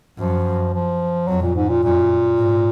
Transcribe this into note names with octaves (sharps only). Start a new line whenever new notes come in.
F#2 F3
F3
F2 F#3
A#2
G#2
A#2
F#2 A#2
G#2